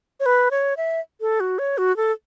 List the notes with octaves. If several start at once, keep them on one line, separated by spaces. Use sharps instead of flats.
C#5
B4
C#5
E5
A4
F#4
C#5
F#4
A4